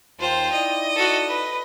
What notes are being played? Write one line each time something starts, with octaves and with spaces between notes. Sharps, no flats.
D#2 F4 C5 G5 A5
D#4 E4 D5 D#5
F#4 A4
B4